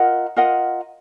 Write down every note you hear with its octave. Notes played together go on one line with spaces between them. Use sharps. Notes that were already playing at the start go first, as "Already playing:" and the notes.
Already playing: F4 A#4 D#5 F#5
F4 A#4 D#5 F#5